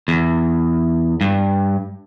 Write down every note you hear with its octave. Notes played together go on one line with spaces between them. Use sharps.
E2
G2